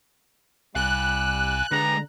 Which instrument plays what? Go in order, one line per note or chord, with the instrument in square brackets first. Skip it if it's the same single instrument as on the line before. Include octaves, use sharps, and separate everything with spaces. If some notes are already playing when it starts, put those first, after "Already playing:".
[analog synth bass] C2 [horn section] G3 [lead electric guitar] F5 G#5 [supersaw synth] F#6
[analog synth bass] D3 [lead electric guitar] G#3 B4 [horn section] G#4 A#5